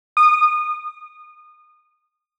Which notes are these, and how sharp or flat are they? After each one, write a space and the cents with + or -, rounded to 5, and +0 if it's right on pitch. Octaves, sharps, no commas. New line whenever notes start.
D#6 -30